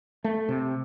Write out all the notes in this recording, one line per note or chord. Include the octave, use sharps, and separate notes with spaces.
A3
C3